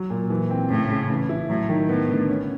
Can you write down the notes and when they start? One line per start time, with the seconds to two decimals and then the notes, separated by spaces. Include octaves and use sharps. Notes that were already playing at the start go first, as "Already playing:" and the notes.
Already playing: F#3
0.10 A#2
0.30 E3
0.50 C4
0.70 A2 C#3
0.90 C#3
1.10 E3
1.29 E4
1.49 A2 F#3
1.69 D#3
1.89 A2 B3
2.09 D3
2.29 C#4